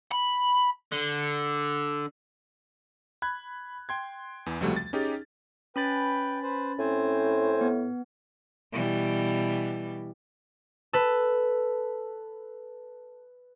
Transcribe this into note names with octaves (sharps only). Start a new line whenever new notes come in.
B5
D3
B5 F#6 G#6
G5 C6 G#6
E2 E3
C#2 C3 F3 G3 A3 F#4
A6
C#4 D#4 G4 G#4
C#4 B4 G5 B5 A6
B4 C5
A2 C4 C5 G#5
B3
B2 E3 G3
A4 B4